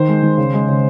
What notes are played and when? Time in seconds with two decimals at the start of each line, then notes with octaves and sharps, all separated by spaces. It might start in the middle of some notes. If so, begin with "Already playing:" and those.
Already playing: D#3 C5
0.09 G#3
0.23 D#3
0.38 C#3
0.54 G#3
0.69 C#3